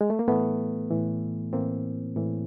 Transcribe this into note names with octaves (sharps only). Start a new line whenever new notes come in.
G#3
A3
A#3
A2 E3 A3 B3
A2 E3
A2 E3 A#3 C4
A2 E3